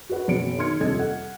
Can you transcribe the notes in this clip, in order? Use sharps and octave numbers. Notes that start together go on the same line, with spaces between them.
F#4 G#4 B4 F#5
F#1 B2 F#3 C#7 D7
D#3 G#4 C6 F6 G#6 C#7
D#1 F2 C3 A4 D#5 G#6
F#5